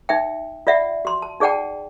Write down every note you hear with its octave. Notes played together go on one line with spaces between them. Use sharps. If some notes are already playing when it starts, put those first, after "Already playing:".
D#4 E5 G5
F4 D5 E5 F#5
F#4 C6
A5
D#4 G#4 D5 F#5 G5 A5